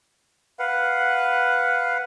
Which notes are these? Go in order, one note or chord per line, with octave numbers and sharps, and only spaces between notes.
B4 F5 F#5